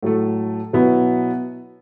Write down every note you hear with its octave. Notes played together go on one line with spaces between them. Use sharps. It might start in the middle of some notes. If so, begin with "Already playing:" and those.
A2 F#3 A3
B2 F#3 B3 E4